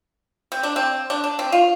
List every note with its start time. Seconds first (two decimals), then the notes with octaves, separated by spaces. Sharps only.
0.52 C4
0.63 D4
0.76 C4
1.10 D4
1.24 D4
1.39 C4
1.52 F4